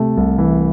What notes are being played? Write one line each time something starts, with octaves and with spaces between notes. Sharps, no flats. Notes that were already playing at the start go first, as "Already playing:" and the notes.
Already playing: C3 A3 A4
C2
E3